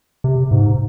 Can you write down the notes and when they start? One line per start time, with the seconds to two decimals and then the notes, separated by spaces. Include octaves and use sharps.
0.24 C3
0.51 G#2